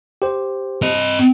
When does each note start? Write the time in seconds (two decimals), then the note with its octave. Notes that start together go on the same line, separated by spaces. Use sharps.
0.22 G4 C5
0.83 C4 D#5